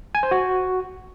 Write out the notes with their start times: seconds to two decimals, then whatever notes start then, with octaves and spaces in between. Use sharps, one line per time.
0.15 G#5
0.23 C5
0.31 F#4